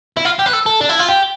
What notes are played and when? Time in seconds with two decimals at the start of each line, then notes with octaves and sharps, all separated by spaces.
0.17 E4
0.25 F4
0.39 G4
0.46 B4
0.53 A4
0.66 A4
0.81 D4
0.89 E4
0.99 F4
1.09 G4